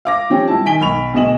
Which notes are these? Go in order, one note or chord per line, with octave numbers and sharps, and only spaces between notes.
F5 D6 A#6
F3 C4 C#4 G4
G3 E4 A5
D#3 G#5 B6 D7 G7
B1 B5 C#6 F7
D2 B2 G#4 D#5 E7 F#7